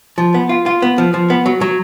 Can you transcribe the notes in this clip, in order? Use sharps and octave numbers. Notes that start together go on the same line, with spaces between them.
F3
B3
F4
F4
B3
F3
F3
B3
F#3
F#3